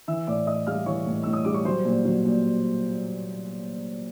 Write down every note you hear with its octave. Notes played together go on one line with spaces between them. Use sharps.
E3 E5 E6
A2 D5 D6
A2 D#5 D#6
G3 F5 F6
E3 C#5 C#6
A2
A2 E6
D#6
G3 D6
C#6
F#3 C5 C6
A#2
F#3
A#2